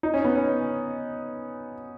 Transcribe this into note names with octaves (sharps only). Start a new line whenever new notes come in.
D#4
C#4
B3
C#4